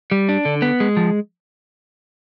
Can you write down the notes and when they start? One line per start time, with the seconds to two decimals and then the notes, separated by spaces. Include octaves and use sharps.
0.11 G3
0.29 D4
0.45 D3
0.62 B3
0.80 G#3
0.97 F3